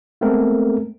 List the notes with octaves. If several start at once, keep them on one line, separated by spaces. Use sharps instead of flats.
G#3 A3 B3 C4 A4 A#4